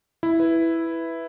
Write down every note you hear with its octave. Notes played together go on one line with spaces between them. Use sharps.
E4
B4